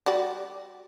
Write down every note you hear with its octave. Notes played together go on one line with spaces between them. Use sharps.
G3 F#4 D5